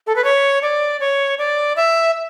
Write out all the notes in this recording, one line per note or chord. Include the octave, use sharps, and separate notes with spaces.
A4
B4
C#5
D5
C#5
D5
E5